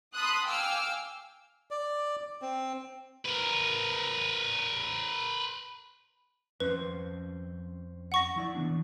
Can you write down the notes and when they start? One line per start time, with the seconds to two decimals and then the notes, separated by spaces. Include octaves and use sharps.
0.16 A5 B5 C6 D#6 F#6
0.46 F5 G5 G#5 D6 E6 F6
1.71 D5
2.42 C4
3.26 A#4 B4
6.60 F2 C#4 B4 C5
8.12 F#5 C#6 A#6
8.36 F3 E4 D5
8.55 E3 B3 D4